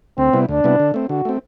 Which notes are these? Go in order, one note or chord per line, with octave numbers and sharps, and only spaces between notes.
D2 C4
C3 G3 B3 E4
D2 D4
C3 G3 B3 E4
D3
A3 C4
D3 F#4
A3 C4